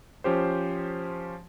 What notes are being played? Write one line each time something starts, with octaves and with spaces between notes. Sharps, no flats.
F3 C#4 G4 C5